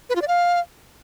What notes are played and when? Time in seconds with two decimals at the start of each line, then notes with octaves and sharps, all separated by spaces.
0.10 B4
0.16 F4
0.22 D5
0.28 F5